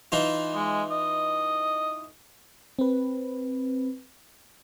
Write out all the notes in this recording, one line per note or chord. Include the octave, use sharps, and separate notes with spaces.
E3 D#4 F4
G#3
D#5
C4 B4